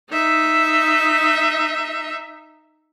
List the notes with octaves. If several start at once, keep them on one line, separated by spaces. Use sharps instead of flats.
D#4 E5